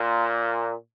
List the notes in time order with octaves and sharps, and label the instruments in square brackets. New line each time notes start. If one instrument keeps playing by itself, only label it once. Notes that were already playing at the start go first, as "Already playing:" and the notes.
Already playing: [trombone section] A#2